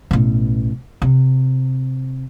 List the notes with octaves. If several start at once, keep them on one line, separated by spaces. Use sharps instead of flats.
A1 B2
C3